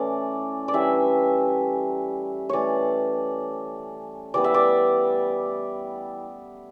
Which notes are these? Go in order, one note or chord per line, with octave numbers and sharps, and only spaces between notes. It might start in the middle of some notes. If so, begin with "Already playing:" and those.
Already playing: E3 A3 C#4 D5
D5
E3 G3 C#4 E5
E3 A3 C#4 C#5 D5
E3 G3 B3 D5
E5
D5